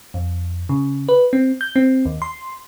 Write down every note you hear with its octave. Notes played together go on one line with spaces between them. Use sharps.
F2
C#3
B4
C4
G6
C4
D#2
C6